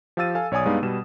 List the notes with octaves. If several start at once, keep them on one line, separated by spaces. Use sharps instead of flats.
F3 G4 F5 E6 A6 D#7
A4 F5 G#5
B1 C#5 D5 G#5 D#6
G2 G#3 B3 D#4 D5 F5
B2 G3 E7